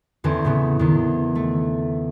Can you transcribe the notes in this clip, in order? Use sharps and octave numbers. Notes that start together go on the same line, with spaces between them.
E2 D3 E3 C4 C#4
A2 C#3 B3
E2 D#3
A3